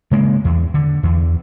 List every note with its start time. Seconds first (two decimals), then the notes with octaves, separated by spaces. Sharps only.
0.11 C#3 G#3 A#3
0.45 E2
0.74 D3
1.03 E2